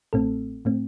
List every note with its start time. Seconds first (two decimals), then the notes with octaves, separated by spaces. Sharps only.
0.13 A1 A2 A3 C4 A4
0.65 A2 A3 C4